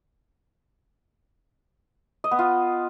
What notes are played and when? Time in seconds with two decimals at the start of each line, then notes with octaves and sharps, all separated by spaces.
2.24 D#5
2.31 B3
2.39 F4